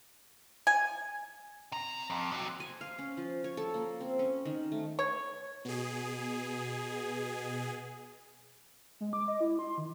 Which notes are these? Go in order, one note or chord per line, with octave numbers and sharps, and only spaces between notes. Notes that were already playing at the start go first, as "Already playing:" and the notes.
G#5
C3 A#5
F2
C3 F#3
G#5
F5
C#4
F3
C#5
A4
A#3
C4
C#4
D#3
A3
C#5
B2 G#4
G#3
D6
D#5
E4
C6
D#3